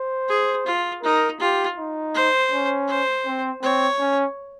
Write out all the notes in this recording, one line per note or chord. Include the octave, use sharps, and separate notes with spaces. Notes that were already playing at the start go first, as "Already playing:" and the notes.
Already playing: C5
G#4
F4
D#4 A#4
F4 G4
D#4
C5
C#4
C5
C4
C4 C#5
C#4